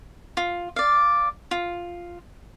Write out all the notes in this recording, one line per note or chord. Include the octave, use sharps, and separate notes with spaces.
F4
D5 F5
F4